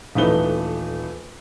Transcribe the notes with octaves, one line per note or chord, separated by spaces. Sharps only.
D#1 E3 A3 D#4 B4 G7